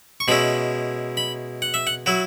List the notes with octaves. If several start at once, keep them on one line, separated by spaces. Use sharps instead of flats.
C#6
B2 G#3 C#4 E4 B5
B5
F#5
E5
F#5
F#3 E4 F#4